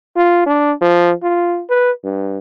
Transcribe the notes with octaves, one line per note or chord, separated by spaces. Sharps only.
F4
D4
F3
F4
B4
G2